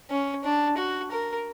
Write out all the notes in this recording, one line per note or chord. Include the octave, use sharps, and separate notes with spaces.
C#4
D4
F#4
A#4